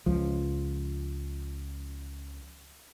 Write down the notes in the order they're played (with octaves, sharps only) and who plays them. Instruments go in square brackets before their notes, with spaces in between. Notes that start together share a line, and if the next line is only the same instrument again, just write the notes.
[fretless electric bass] C#2 F3